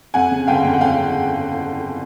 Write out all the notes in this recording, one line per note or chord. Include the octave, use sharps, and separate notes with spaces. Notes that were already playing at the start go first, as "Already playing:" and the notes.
F2 F#5 G#5
C#3
G1 F5 G5
F2
F#5
F2 F5 G5